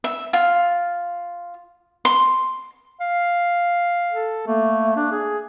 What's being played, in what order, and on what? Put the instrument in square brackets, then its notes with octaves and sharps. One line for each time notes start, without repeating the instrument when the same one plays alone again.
[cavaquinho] E5
F4
C6
[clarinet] F5
[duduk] A4
[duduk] A3 [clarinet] A#3
[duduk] D4
G#4